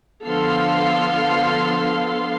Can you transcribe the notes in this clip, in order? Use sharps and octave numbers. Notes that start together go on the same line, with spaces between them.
D3 F3 B3 A4 F5 C6